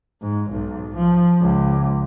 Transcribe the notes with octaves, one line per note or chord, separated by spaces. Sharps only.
G#2
B1
F3
C#2